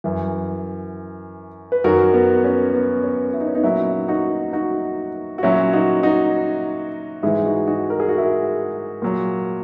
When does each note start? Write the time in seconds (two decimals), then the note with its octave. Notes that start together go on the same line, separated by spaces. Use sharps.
0.04 F#2 E3
1.72 B4
1.84 F#2 D#3 F#3 F#4 A#4
2.14 B3
2.44 C#4
2.74 B3
3.04 C#4
3.33 E4
3.41 D#4
3.47 C#4
3.55 B3 D#4
3.63 A#2 F#3 C#4 E4
4.08 D#4 F#4
4.53 D#4 F#4
5.38 F#4
5.43 A#2 F#3 C#4 E4
5.73 D#4 F#4
6.03 D#4 F#4
7.23 G#2 E3 E4 G#4
7.45 D#4 F#4
7.67 D#4 F#4
7.90 A#4
8.00 G#4
8.09 F#4
8.18 E4 G#4
9.02 A#2 F#3